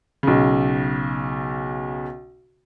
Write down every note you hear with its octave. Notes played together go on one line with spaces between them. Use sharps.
B1 C#3